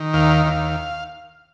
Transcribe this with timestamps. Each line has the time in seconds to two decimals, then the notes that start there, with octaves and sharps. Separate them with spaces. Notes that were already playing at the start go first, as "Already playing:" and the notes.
Already playing: D#3
0.13 D#2 F5
0.46 D#2